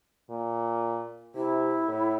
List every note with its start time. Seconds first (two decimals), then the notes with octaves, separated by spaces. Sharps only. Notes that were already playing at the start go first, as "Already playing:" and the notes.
0.30 A#2
1.35 C3 E4
1.88 A2